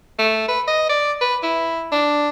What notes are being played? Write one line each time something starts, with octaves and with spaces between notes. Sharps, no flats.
A3
B4
D#5
D5
B4
E4
D4